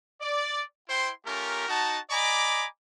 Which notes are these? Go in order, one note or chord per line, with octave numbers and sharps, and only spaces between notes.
D5
E4 C5 G5 C6
A3 C#4 F4 G4 A#4
D#4 F#4 A5
D5 D#5 G#5 A#5 B5 D6